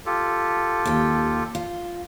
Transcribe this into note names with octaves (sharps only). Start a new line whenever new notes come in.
F4 G4 A4
D#2 G5
F4